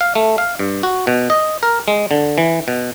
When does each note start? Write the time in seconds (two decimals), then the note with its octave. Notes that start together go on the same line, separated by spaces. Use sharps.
0.01 F5
0.15 A3
0.38 F5
0.59 G2
0.83 F#4
1.07 B2
1.30 D#5
1.63 A#4
1.88 G#3
2.11 D3
2.38 E3
2.68 B2